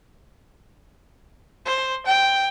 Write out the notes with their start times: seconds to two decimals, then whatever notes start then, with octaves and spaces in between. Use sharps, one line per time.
1.66 C5
2.06 G5